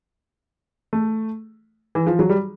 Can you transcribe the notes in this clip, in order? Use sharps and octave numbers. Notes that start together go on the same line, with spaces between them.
A3
E3
F3
F#3
G3